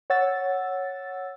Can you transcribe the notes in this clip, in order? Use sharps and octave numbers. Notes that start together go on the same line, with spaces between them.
C#5 F#5 E6 A6